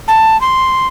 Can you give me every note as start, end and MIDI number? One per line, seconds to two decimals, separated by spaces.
0.08 0.39 81
0.41 0.87 84